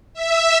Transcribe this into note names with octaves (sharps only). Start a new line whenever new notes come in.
E5